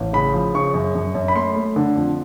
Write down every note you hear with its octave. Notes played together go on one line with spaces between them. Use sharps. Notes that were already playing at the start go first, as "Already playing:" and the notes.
Already playing: A1
C#3 B5
F3
C#3 C#6
F#2
F#2
F#2
B5
A3 C6
A3
D3
F2